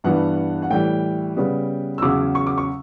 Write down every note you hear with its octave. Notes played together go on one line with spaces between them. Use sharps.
G2 E3 B3 D4 F#5
F#5
A2 E3 G3 G5
C#3 G3 B3
E6
E2 C#3 F#3 C#4 D6
C#6
D6
C#6